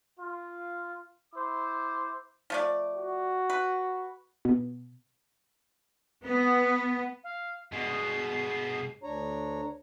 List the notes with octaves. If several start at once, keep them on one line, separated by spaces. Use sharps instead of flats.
F4
E4 C5 D6
F3 A3 D5
F#4
B4
B2
B3
F5
G2 B2 G#3 C7
D2 D4 C#5 A#5